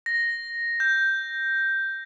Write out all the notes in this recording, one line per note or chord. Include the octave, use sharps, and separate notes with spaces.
A#6
G6